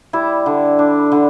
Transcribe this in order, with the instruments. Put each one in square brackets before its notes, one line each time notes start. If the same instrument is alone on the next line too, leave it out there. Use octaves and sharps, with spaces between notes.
[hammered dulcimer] G3 E4
D3
D4
D3